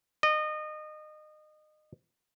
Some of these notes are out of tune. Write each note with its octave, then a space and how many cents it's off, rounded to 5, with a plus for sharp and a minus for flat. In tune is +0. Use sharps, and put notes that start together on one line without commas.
D#5 -25